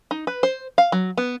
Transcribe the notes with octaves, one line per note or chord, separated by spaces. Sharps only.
D#4
B4
C5
F5
F#3
B3